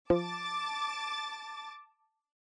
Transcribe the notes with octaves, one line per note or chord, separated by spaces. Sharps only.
F3 A5 D6 A6